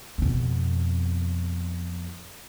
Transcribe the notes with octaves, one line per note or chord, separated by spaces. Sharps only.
F2 B2